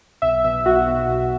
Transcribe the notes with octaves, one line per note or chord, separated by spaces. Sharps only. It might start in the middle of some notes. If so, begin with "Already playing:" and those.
B1 E5
B2 E5
B1 F#4
B2
B1